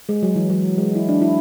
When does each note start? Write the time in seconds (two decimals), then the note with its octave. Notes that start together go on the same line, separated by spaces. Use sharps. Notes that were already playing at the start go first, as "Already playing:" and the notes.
0.09 G#3
0.23 F#3
0.36 E3
0.50 F#3
0.78 G#3
0.95 E4
1.09 D4
1.21 E4